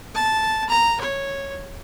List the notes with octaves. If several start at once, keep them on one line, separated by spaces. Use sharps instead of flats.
A5
A#5
C#5